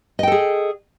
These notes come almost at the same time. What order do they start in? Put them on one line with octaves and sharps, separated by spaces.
D#5 G5 A4 G#4